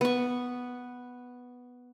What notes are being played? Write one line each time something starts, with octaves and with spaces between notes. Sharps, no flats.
B3 C#6